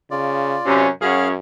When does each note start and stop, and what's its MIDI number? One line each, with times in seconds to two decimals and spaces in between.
0.11 0.57 49
0.11 0.87 65
0.11 0.87 74
0.66 0.88 42
0.66 0.88 48
0.66 0.89 61
1.01 1.36 42
1.01 1.30 61
1.01 1.30 66
1.01 1.30 68
1.01 1.28 77
1.01 1.28 89